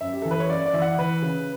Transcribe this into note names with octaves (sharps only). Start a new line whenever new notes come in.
F#2 E5
G4
E3 A4
B4
C#5
F#2 D5
D5
E3 E5
F#5
E3 B4
C#3